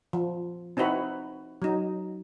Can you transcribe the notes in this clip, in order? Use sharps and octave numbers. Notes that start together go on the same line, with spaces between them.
F3
C4 D#4 E4 F#4 B4
F#3 D#4